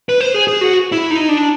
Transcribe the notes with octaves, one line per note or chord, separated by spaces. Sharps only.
B4
C5
G#4
G#4
F#4
E4
D#4
D4